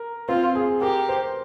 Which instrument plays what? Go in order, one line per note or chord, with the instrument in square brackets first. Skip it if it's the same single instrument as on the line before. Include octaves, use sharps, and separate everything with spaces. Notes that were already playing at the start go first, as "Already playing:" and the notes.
Already playing: [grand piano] A#4
[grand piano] C4 [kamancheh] F4
[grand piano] G#4
[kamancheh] G4 [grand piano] A#4
[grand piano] C5